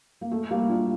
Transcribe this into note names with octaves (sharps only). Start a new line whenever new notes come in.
A#3
A3
G3 A#3
D4 F4